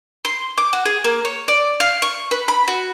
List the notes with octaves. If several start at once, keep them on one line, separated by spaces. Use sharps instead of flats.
C6
D6
F#4
G#4
A#3
C#5
D5
F5
C#6
B4
B5
F#4